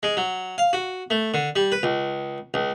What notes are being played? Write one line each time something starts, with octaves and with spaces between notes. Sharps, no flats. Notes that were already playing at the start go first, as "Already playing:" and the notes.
G#3
F#3
F5
F#4
A3
D3
G3
B4
C#2
C#2